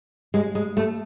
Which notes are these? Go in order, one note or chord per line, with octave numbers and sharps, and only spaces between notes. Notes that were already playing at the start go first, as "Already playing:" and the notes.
G#3
G#3
A3